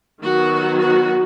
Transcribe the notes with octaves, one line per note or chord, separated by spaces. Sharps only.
D#3 F#3 B3 F#4
F#4